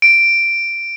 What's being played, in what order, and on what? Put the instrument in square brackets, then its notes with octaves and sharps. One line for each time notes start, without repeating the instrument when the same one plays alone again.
[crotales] D7